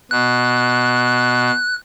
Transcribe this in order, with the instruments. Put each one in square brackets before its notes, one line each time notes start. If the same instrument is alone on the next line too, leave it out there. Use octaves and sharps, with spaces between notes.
[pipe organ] B2 [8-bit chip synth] F#6